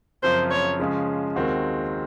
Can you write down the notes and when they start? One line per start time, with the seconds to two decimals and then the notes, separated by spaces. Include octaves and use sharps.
0.23 F#2 C#3 F3 C4 C5
0.51 C#5
0.79 C#3 F3 G#3 C#4 G#4
1.36 D#2 D#3 G#3 C4 F#4